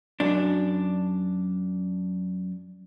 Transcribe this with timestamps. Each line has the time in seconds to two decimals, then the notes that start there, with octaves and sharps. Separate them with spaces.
0.20 F#2 D4